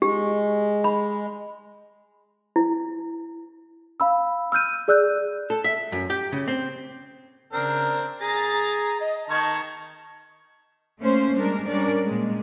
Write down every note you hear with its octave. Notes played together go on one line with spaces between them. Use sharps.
G#3 G4
B5
E4
F5 B5 E6
E6 F6 G6 D#7
G#4 D5 E6 F#6 G6
A4
E5
F#2
G4
C#3
C4
C#3 C4 D4 A#4
G#4 A#5 A6 A#6
D#5
D#3 A5 A#5 C#6 G#6
A3 A#3 C#4 C5
G3 G#3 D4 A#4
G3 C#4 D4 A#4 D5
A#2 G#3